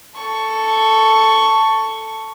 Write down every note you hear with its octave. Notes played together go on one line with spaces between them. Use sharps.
A4 C#6